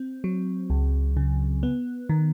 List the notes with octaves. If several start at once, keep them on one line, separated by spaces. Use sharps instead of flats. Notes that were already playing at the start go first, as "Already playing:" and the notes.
Already playing: C4
F#3
C#2
C#3
B3
D#3